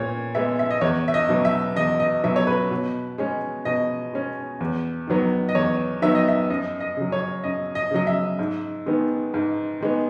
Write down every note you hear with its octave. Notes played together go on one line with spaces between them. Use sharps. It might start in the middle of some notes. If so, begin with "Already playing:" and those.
Already playing: A#2 G#3 B3 C#5
G#3 B3 E5
E5
D#5
E2 C#5
E5
D#5
B2 F#3
E5
E2 D#5
D#5
B2 F#3 E5
C#5
B4
B2
G#3 C#4
B2 D#5
G#3 C#4
E2
D#3 F#3 B3
D#5
E2 C#5
D#3 F#3 B3 E5
D#5
E5
F#2 D#5
D#5
C#3 F#3
C#5
F#2 D#5
D#5
C#3 F#3 D#5
E5
G#2
D#3 G#3 B3
G#2
D#3 G#3 B3